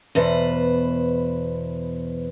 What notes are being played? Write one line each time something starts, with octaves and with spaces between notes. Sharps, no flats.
E2 B2 B4 C5